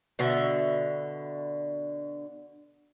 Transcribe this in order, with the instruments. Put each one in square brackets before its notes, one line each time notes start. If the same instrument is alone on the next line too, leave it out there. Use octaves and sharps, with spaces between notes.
[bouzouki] B2 D3 E5